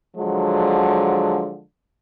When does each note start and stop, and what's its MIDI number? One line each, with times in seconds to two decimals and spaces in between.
0.17 1.60 50
0.17 1.60 53
0.17 1.60 54
0.17 1.60 56